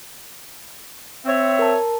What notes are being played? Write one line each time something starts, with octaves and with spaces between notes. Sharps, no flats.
C4 C#5 E5
A#4 A5